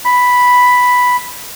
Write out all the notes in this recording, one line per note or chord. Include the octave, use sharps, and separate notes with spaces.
B5